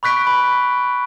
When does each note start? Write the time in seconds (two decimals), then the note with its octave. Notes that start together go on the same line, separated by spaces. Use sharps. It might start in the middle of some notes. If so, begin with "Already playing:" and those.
0.03 B5 C#6 F#6 B6 D7
0.27 B5